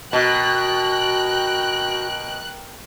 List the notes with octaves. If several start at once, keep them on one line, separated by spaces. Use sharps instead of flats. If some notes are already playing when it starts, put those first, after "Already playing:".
B2 F#4 A#4 G5 F#6